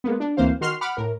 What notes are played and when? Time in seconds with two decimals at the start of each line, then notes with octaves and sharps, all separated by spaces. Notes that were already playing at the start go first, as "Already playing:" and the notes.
0.04 G#3 A#3 B3
0.20 D4
0.37 D2 E3 A#3 C4 C5 F5
0.61 D#3 F#4 C6 F6 C7
0.81 F#5 B5 D6 F6
0.97 A2 A#4